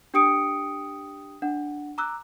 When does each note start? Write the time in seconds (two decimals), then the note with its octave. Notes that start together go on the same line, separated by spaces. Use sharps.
0.14 D4 G4 G5 D#6 C#7 D7
1.42 D4 F#5
1.98 A#5 D6 E6 F#6